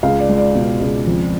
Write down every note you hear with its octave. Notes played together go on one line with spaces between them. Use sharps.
C#2 F5
D5
G#3
D5
B2
C#2
F2